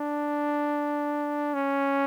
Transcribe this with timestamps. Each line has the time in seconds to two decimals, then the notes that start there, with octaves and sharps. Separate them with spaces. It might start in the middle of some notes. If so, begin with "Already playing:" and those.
Already playing: D4
1.54 C#4